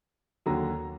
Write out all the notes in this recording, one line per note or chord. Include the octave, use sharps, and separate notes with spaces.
D#2 D3 F#3 A#5